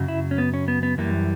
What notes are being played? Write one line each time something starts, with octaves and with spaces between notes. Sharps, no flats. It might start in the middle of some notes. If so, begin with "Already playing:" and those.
Already playing: F#2 C#3 F#3
E4
C#4
B3
C#4
B3
B3
F#2 E3 G3 A#3